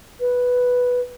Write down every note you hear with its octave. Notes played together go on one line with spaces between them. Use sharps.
B4